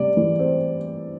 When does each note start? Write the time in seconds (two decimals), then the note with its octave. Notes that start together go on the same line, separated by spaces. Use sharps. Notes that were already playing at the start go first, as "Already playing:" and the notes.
Already playing: C3 G3 D5
0.17 E3
0.39 C4